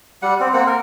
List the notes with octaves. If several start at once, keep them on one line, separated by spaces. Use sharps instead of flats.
G3 F#5
C4
A#3 C4 F#5
A#4